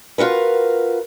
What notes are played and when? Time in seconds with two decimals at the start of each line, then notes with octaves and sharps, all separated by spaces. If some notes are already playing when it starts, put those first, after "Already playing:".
0.18 F4 F#4 A#4 B4